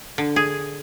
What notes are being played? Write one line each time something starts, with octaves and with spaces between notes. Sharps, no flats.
D3
G#4